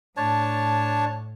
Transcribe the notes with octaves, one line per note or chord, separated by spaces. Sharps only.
A2 D4 C#5 A5